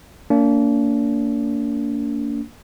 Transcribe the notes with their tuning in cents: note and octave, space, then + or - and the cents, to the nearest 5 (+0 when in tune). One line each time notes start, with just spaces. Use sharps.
A#3 -25 D4 -40